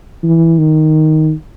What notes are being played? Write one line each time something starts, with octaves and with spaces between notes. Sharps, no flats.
E3
D#3